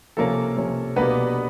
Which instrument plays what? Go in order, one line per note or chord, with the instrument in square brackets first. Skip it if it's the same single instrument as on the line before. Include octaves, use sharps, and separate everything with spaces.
[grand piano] C3 F3 A#3 C#4 A4
C3 F3 A#3 C#4
B2 G3 A#3 B3 D4 B4